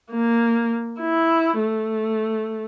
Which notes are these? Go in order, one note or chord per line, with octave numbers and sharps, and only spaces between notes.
A#3
E4
A3